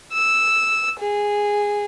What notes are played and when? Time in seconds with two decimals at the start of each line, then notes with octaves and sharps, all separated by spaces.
0.13 E6
1.00 G#4